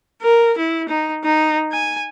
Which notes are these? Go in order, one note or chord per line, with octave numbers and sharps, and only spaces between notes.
A#4
E4
D#4
D#4
G#5